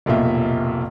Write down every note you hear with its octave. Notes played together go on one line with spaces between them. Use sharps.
F1 B1 A#2 F4 E5